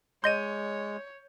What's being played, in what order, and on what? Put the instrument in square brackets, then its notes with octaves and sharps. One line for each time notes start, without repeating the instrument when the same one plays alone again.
[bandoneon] G#3 [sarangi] C#5 [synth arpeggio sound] D#5 C6 [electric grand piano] G6 D#7